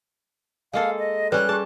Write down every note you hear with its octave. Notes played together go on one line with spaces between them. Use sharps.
G#3 A#3 A4 F5
D#5
G3 C#4 B4 F#6
G4 G#4 A5